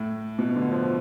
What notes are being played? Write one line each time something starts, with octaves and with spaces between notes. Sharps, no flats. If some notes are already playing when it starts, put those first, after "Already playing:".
Already playing: A2
B2
D3
F3